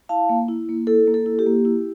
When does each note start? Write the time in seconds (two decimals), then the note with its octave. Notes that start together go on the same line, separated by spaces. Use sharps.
0.09 E4 F5 A5
0.29 A#3
0.49 E4
0.69 A#3
0.87 E4 A4
1.07 A#3
1.14 A4
1.26 E4
1.39 G4
1.47 A#3
1.65 E4